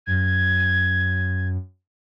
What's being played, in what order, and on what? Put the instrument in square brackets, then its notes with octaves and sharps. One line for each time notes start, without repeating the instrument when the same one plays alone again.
[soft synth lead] F#2 [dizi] G#6